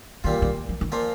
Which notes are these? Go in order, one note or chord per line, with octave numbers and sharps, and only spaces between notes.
A#2 D#3 G3 A#3 F4
D#3
F3
D#3
A#2 F3 A#3 F4 A#4